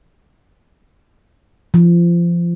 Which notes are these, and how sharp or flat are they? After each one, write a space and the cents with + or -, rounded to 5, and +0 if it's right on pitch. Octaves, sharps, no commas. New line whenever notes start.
F3 -25